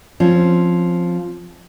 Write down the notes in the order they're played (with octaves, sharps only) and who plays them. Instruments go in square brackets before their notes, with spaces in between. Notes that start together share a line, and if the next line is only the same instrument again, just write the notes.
[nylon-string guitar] F3 C4 C#4